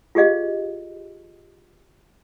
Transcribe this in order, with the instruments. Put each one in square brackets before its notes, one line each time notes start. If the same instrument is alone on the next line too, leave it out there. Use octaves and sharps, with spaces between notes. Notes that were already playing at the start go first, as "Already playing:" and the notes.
[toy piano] F4 G4 G#4 D#5 F5